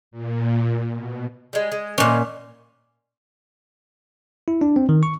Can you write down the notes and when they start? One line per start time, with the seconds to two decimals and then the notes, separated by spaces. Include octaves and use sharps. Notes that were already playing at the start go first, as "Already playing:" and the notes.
0.11 A#2
0.95 B2
1.53 G3 G#3
1.72 G#3
1.98 A#2 D#3 E3 C4 C#4
4.48 E4
4.61 D4
4.76 C4
4.89 D#3
5.03 C#6